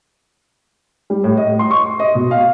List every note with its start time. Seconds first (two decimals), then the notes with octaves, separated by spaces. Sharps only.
1.10 G3
1.24 A2
1.37 D#5
1.59 C6
1.71 C#6
2.00 D#5
2.15 B2
2.31 F5